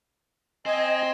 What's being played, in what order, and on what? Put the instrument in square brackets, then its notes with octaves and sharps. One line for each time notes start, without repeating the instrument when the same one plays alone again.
[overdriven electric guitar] C4 [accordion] D#5 G#5